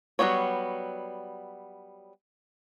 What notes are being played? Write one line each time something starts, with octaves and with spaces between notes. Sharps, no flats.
F#3 G3 A#3 B3 C#5